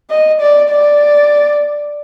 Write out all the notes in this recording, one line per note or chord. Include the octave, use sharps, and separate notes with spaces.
D#5
D5
D5